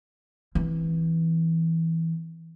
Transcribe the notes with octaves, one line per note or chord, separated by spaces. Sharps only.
E3 C4